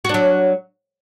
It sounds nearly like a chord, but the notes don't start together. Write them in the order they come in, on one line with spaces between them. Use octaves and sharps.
F#4 D4 F#3